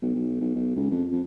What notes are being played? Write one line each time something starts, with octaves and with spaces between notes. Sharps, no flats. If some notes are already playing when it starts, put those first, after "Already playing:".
B1
B1
B1
B1
C#2
F2
F2